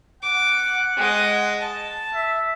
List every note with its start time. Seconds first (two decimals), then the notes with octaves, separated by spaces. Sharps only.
0.22 F#5 D6
0.97 G#3 D#5
1.61 A5
2.14 E5